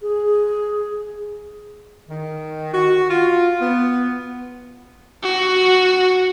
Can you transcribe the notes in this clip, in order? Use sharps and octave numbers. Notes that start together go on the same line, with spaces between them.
G#4
D#3
F#4
F4
B3
F#4